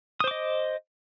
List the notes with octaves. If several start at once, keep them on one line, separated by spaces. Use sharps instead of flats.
C5 D#5 D6 D#6